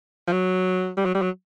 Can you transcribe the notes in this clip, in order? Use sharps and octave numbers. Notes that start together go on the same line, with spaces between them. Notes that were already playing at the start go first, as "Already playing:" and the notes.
F3
F#3
G3
F#3
G3
F#3